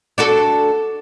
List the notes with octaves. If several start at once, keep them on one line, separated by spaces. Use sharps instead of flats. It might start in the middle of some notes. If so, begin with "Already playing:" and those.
D4 F#4 A4